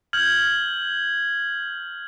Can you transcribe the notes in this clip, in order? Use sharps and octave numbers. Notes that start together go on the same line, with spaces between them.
F6 G6 G#6 F#7